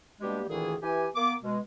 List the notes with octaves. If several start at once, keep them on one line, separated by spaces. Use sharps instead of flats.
B2 G3 G#3 A#3 D4 G4
D2 A#2 D#3 E3 E4 G#4
E3 G4 G#5
A#3 B3 D6
B2 G#3